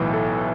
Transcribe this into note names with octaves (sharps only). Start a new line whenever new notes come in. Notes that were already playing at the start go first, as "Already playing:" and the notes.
Already playing: B1 A2 E3 B4
A4